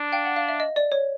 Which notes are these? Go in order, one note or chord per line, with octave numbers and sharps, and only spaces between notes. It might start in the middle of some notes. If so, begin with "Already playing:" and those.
Already playing: D4
F5 G5
F#5
F5
E5
D#5
D5
C#5